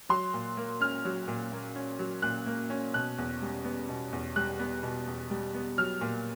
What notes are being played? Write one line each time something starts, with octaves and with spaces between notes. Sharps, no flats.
F#3 C6
A#2
A#3
C#4 F6
F#3
A#2
A#3
C#4
F#3
A#2 F#6
A#3
C#4
B2 F#6
E2
G3
B3
B2
E2
G3 F#6
B3
B2
E2
G3
B3
F#3 F6
A#2